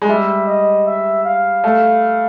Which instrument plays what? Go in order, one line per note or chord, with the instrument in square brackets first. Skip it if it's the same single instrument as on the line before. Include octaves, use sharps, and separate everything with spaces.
[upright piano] G#3
[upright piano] G3 [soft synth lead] E5
[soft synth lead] D#5
E5
F5
[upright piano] A3